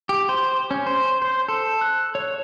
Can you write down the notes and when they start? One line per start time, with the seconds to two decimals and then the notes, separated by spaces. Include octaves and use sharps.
0.09 G4
0.29 C5
0.71 C#4
0.87 C5
1.22 C5
1.48 A4
1.81 F#6
2.15 C#5